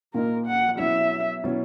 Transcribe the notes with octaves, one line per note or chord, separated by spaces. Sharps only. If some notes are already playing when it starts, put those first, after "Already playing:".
A#2 A#3 D#4 A#4
F#5
B2 F#3 C#4 E4 E5
B2 F#3 C#4 E4